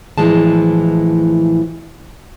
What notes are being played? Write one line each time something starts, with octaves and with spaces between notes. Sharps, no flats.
A2 E3 F3 G#3 A5